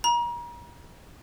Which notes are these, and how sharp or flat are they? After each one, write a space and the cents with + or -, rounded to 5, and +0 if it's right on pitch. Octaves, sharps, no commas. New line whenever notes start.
A#5 +35